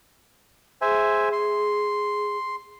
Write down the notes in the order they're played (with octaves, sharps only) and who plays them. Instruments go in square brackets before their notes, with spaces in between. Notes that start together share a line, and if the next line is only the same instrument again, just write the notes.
[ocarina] G#4 [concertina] C5 E5 G#5
[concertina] C6